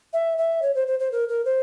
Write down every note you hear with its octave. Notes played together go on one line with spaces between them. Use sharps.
E5
E5
C#5
C5
C5
C5
A#4
A#4
C5